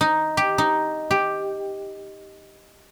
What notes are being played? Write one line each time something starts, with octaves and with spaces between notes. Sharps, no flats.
D#4
G4
D#4
G4